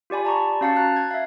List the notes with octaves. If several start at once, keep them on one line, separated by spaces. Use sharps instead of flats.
F4 G4 D5 G#5 B5
A5 A#5 C#6
C#4 F#4 F5 A5 A6 C#7
A#5 F#6 A6
G#6
E5 F5